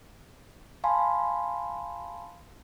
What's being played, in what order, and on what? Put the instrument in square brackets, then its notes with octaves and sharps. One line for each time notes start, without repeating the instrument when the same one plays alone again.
[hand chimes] F5 G#5 A5 B5 C6